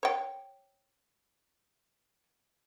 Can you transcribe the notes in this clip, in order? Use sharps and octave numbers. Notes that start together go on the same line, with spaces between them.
C#5 G5